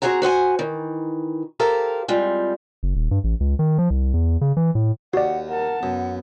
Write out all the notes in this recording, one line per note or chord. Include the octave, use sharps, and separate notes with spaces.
C4 F#4 G#4 F#5 A#5
F#4 C5 F#5 G#5
D#3 E3
G4 A4 A#4 C5 F5
G3 G#3 C4 F4
F#1
D#1
G2
A1
C#2
D#3
F3
C2
E2
C#3
E3
A2
D#2 F#4 D5 F#5
A#4 F#5 A5
F#2 B3